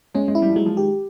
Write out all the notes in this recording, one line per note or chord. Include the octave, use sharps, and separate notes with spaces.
G#3 C#4
G#3
E4
G3
F3
F#3 G#3
F3
D#3 G4